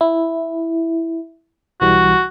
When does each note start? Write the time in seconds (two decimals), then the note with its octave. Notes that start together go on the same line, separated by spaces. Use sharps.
0.01 E4
1.81 B1 E3 G3 F#4